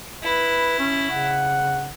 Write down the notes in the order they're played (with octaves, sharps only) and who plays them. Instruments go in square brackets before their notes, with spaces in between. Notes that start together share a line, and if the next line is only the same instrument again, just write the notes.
[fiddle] E4 [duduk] B4
[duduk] C#4
[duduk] C#3 [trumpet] F#5